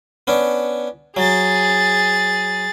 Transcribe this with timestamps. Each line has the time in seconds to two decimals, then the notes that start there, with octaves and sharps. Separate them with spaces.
0.27 B3 C#4 D4
1.17 F#3 G#4 A6